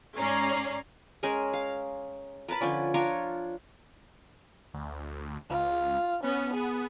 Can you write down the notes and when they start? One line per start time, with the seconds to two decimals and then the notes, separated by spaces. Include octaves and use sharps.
0.17 G#2 C#4 C#5 D5 A#5 C7
1.23 G#3 C#4 G#4 A#4
1.53 F5
2.48 A#4 B4 A5 B5
2.61 D3 F3 C#4 D5
2.94 D4 F4 A#4 C#5
4.74 D2
5.50 C#2 F4
6.24 B3 C#4
6.54 G#4